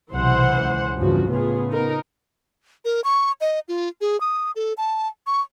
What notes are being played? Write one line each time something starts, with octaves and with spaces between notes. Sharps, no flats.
B1 C3 E3 C5 F#5
C#2
E2 G2 C#3 F3 F#4
A2 C#3 B3 F4 G#4
D#4 A#4
A#4
C#6
D#5
F4
G#4
D#6
A4
A5
C#6